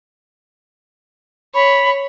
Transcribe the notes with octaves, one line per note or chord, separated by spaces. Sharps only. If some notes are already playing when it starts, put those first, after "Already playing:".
C#5 B5